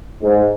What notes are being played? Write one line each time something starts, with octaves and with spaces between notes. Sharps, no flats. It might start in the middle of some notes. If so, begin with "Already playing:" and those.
G#2